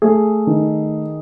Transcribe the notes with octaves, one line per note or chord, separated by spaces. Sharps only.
A3 G#4
D#3